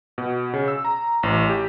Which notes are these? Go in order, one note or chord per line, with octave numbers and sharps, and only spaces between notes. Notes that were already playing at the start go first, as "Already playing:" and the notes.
B2
C#3
E6
A#5
A1
G4